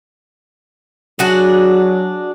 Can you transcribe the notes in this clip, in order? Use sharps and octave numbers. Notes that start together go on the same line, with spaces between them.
F#3 D4 F#4 G#4